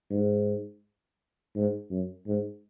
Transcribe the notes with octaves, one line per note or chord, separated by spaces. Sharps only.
G#2
G#2
F#2
G#2